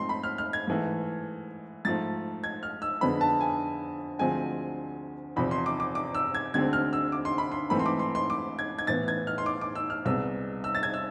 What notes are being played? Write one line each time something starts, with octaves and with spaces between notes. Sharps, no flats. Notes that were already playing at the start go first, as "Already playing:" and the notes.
Already playing: G#2 F3 A3 C4 C6
B5
F6
F6
G#6
G#2 E3 A3
G#2 F3 A3 A6
G#6
F6
E6
F2 D3 G#3 B3 B5
A5
G#5
D2 D3 F3 G#3 C4 G#5
E2 C3 F3 B5
C6
D6
D6
D6
E6
G#6
D2 D3 G#3 C4 G#6
F6
E6
D6
C6
B5
C6
G#2 E3 A3 C4 B5
C6
D6
C6
C6
D6
G#6
G#6
A2 E3 B3 A6
G#6
F6
C6
D6
D6
E6
F6
C2 C3 G#3 B3 E6
E6
A6
G#6
E6